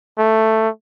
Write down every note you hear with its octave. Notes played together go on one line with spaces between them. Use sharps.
A3